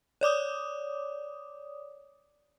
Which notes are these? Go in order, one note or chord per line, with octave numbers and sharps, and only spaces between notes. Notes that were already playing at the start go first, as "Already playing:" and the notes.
C#5 D5 D6 D#6